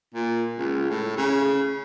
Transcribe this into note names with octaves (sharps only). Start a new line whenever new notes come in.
A#2
C#2
A2
C#3